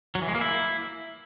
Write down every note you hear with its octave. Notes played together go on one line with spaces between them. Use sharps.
F#3
E3
G#3
A#3
E4